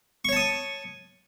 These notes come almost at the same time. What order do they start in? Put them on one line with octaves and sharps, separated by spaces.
C#6 C#5 A5 D#6